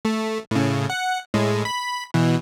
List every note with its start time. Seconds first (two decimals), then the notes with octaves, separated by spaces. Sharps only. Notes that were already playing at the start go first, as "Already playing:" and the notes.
0.05 A3
0.51 A2 C#3
0.90 F#5
1.34 A2 G#3
1.65 B5
2.14 B2 E3